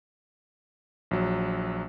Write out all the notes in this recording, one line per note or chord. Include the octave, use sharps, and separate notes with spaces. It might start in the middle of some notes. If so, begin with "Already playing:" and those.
A#1 F#3